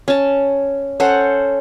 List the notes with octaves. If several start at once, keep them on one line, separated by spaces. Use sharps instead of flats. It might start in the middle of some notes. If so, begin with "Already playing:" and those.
C#4 A5
C#4 A4 C5 F#5